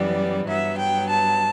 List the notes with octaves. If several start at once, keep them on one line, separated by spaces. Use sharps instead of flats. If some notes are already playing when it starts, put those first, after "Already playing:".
Already playing: F#2 E3 G3 B3 D5
G2 F#3 B3 E5
G5
A5